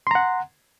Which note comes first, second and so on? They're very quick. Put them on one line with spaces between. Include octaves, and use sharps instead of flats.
C6 A#5 F#5